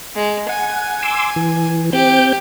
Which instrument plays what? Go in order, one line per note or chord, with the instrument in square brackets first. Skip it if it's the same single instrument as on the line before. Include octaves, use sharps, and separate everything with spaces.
[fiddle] G#3
[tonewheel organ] F#5 [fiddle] G#5
[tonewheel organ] C6 D6 E6
E3
[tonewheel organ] C4 G6 [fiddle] G4